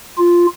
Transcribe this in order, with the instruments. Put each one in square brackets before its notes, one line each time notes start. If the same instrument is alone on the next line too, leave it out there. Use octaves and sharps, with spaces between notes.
[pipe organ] F4